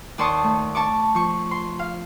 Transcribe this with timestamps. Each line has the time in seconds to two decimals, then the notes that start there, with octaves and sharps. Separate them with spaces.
0.18 D#2 D5 A5 C6 C#6 D#6
0.43 A3
0.75 A5 C#6 D6
1.15 F3 C#6
1.51 C6
1.79 F5